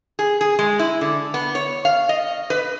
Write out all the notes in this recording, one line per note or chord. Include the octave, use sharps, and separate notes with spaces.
G#4
G#4
G#3
E4
D3
B3
C#5
F5
D#5
B4